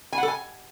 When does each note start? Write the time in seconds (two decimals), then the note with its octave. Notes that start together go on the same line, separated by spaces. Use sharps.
0.12 G#5
0.18 F#5
0.23 A4
0.28 G#5